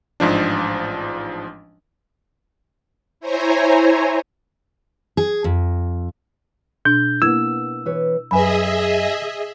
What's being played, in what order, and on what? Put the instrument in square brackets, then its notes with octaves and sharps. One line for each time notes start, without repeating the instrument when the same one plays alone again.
[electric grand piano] A1 G#2 F3 D4
[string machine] E4 C5 C#5 G#5 A#5
[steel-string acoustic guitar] G#4
F2
[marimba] B2 D4 [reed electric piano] G6
[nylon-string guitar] A#3 B3 [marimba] E4 G#6 [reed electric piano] E6
[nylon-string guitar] E3 B4 C#5
[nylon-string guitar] F#2 [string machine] G#4 D#5 E5 [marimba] B4 G#5 B5